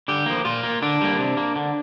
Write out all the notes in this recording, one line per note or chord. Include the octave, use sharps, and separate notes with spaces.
D3 G4
F3 A#3
A#2 F4
A#3
D3 D4
G3 A#3
C3
A#3
D3